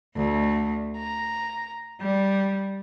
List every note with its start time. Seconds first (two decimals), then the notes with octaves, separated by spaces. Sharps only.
0.16 D2
0.97 A#5
2.02 G3